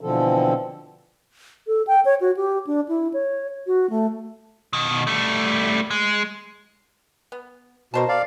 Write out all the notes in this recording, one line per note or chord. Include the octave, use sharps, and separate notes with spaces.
B2 D3 E3 F3 C4 A4
A4
G5
C#5
F#4
G4
D4
E4
C#5
F#4
A3
B2 D#3
G3 A3
G#3
B3
B2 A#4 C5 A5
D5 F5